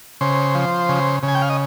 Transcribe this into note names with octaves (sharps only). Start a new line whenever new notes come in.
C#3 C5
F3
C#3
C#3
G#5
G5
F5
D#5